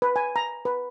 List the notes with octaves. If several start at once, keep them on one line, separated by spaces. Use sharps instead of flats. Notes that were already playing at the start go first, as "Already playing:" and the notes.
B4
G#5
A#5
B4